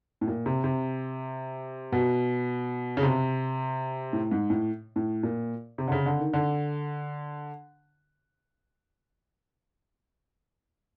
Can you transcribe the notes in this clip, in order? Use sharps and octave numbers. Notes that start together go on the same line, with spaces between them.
A2
A#2
C3
C3
B2
C#3
C3
A2
G#2
A2
A2
A#2
C3
D3
C#3
D3
D#3
D3